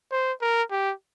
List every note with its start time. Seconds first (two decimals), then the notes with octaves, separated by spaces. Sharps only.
0.11 C5
0.42 A#4
0.71 G4